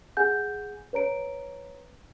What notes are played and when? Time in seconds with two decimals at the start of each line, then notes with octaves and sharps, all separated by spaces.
0.17 G#4 F#5 G#5 G6
0.93 B4 C#5 A#5 D7